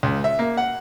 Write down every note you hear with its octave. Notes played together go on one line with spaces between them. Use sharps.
C#2
E5
A#3
F#5